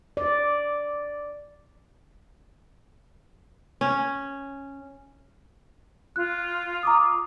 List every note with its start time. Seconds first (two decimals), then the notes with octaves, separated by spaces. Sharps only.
0.17 D5
3.81 C#4
6.16 F4 F#6
6.83 A#5 D6 D#6